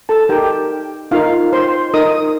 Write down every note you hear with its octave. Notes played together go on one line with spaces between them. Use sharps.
A4 A5
D#4 G4 A#4 G5
D#4 F4 A#4 F5
C5 C6
D#4 A#4 D#5 D#6